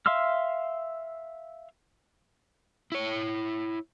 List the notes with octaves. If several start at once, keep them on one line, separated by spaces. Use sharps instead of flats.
E5 F5 C6 E6 F6
E4 C#5